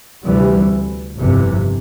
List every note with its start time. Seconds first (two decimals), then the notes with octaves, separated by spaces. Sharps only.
0.24 D2 C3 E3 G3
1.19 G1 F2 C3 E3